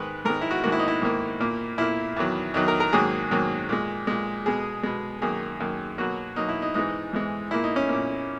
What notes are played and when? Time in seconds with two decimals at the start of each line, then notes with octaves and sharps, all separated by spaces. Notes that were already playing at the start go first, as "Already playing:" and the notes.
Already playing: G#2 D#3 G#3 B4
0.25 G#2 D#3 G#3 A#4
0.41 E4
0.51 F#4
0.64 G#2 D#3 A#3 F#4
0.72 E4
0.79 D#4
0.88 E4
1.02 G#2 D#3 A#3
1.40 A#2 A#3
1.78 A#2 A#3 E4
2.17 E2 D#3 F#3
2.54 E2 D#3 F#3 D#4
2.68 A#4
2.80 A#4
2.93 G#2 D#3 F#3 A#3 G#4
3.31 G#2 D#3 F#3 A#3
3.69 A#2 G#3
4.07 A#2 G#3
4.46 B2 G#3 G#4
4.83 B2 G#3
5.22 F#2 D#3 A#3 G#4
5.60 F#2 D#3 A#3
5.98 B2 F#3 A#3 F#4
6.36 B2 F#3 A#3 D#4
6.49 E4
6.62 D#4
6.74 G#2 E3 G#3 D#4
7.13 G#2 E3 G#3
7.51 A#2 A#3 E4
7.64 D#4
7.76 C#4
7.89 A#2 A#3